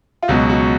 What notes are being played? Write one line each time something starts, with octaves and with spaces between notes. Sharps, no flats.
F4
C#2 B2 F#3 F#4
F#4